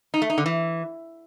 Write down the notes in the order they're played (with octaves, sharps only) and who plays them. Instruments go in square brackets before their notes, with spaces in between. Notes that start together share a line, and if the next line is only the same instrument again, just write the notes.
[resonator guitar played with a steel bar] D#4
A3
D#4
D3
E3